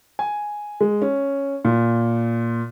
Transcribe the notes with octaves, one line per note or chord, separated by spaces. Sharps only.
G#5
G#3
C#4
A#2